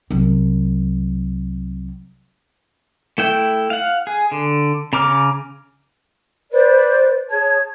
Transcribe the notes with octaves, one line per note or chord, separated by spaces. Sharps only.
C2 F#3
A3 E4 G5
F5 F#5
G#4
D3
C#3 A#5 D6 F6
B4 C5 D5
G#4 C#5 A5 G#6